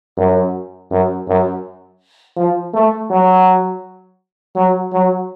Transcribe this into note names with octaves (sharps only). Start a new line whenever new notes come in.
F#2
F#2
F#2
F3
A3
F#3
F#3
F#3